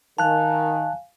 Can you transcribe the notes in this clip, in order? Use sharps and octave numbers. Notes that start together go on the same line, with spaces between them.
D#3 F5 G#5 A5 F#6